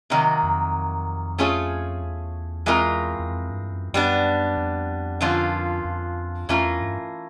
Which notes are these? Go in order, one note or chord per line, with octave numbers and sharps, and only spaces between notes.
C3 D#3 F#3 A#3
F2
A3 C#4 F4 G#4 C#5
E2
E3 G#3 C4 F4 A#4
E2
F2
G2
F#2
F#2 G3 B3 D4
F2
D3 F3 A#3 C#4 F4
F2
F2 E3 A3 C#4 F4 A#4
E2
G2